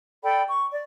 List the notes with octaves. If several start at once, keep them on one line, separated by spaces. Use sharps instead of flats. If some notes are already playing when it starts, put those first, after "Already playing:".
A4 D5 G5 B5
C#6
D5